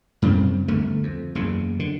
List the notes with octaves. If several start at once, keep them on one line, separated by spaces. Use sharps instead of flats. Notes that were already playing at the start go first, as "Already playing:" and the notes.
F#2 C#3 G3 C4
G1 D2 D3 A3
F2
F#1 E2 C#3
D3